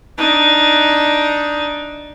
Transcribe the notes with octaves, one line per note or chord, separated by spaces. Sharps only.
D4 D#4